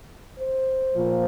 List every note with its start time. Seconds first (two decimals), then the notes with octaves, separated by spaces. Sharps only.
0.39 C5
0.94 A#2 F3 A#3